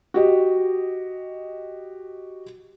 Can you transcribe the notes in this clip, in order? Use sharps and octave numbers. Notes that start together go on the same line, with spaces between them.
F#4 G4 D#5